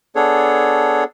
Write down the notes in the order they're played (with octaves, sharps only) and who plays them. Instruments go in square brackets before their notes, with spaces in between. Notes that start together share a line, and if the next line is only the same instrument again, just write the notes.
[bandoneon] B3 D4 G#4 A4 C#5